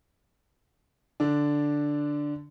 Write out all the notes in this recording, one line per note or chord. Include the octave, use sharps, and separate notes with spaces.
D3 D4